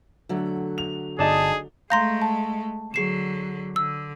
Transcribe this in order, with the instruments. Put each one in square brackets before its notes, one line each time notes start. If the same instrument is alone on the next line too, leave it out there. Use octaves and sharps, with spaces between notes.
[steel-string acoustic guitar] D3 F#3 A3
[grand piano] F7
[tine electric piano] G1 A5 [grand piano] D4 D#4 [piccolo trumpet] G#4
[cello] G#3 A3 [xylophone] F5 A#5 C6 [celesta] G6 A#6
[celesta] A5
[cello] D3 F#3 [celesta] G#4 C7 E7
[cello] D3 [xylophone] E6